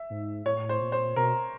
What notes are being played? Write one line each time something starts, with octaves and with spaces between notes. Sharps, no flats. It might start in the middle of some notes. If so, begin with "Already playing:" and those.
Already playing: E5
G#2
A2 C#5
C5
A#2
C5
B2 A#4